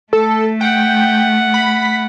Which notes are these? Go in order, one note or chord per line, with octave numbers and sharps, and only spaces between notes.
A3 A4
F#5 G5
B5